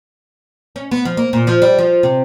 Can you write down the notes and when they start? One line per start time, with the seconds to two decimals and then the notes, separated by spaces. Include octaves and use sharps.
0.76 C#4
0.91 B3
1.05 F3
1.17 A#3
1.33 A#2
1.47 F3
1.62 G3
1.79 F3
2.03 C3